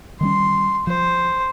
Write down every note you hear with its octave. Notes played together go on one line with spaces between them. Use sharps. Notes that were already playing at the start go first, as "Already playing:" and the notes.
D#3 G3 C#4 C6
F3 C5